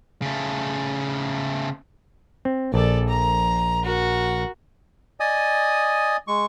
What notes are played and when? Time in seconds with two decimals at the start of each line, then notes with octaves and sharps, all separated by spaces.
0.22 C#3 A3
2.45 C4
2.74 A#1 A4 D5
3.09 A#5
3.84 F#4 A#4
5.20 D5 D#5 G#5 D#6
6.27 G#3 C#6